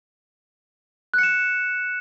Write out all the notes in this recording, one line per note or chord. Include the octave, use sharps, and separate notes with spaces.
F#6 C#7 E7